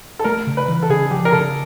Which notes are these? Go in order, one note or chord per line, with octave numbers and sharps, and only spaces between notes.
A4
A3 A#4
C#3
B4
E3
A4
C#3 G#4
F3 G4
A#4
C#3 A4